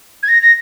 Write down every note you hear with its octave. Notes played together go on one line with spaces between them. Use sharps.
G#6
A#6
A#6